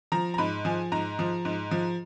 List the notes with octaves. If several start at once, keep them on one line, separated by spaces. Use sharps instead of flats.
F3 A#5
A#5
G#2 B5
F3 G#5
G#2 A#5
F3
G#2
F3